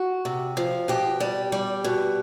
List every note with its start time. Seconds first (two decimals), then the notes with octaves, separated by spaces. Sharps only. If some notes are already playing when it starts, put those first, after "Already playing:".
Already playing: F#4
0.25 C3
0.57 F3
0.88 B2 G4
1.20 G3
1.52 G3
1.84 B2